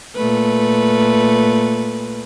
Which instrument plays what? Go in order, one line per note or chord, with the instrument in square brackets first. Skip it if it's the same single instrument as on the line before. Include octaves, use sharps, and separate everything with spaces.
[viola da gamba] A#2 A3 B4